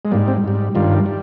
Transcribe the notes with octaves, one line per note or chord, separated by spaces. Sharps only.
G#3
G#2 G3 A#3
C4
G#2 G3
G2 D#3 G3 F4
G3